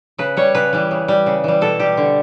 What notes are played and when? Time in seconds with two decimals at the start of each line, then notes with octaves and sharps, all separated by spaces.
0.18 C#3 B4
0.37 G3 C#5
0.55 C#3 B4
0.73 E3 G3
0.91 C#3
1.08 G3
1.26 C#3
1.44 E3 G3
1.61 B2 A4
1.80 G3 G4
1.97 D3